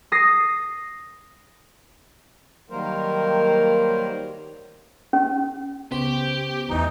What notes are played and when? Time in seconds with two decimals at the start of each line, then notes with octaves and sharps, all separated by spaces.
0.12 D#6 A#6 C7
2.70 D#3 F#3 G3 A#3 A#4 C5
5.13 C#4
5.92 C#2 C#3 B3 G4 C5
6.69 E2 D3 E3 D#4